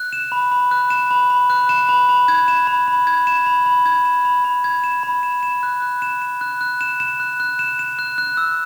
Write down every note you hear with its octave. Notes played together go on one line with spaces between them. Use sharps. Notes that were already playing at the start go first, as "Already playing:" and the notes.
Already playing: F#6
E7
B5
B5
F#6
E7
B5
B5
F#6
E7
B5
B5
G#6
E7
B5
B5
G#6
E7
B5
B5
G#6
E7
B5
B5
G#6
E7
B5
E7
E7
F#6
F#6
E7
E7
F#6
F#6
E7
E7
F#6
F#6
E7
E7
F#6
F#6
E6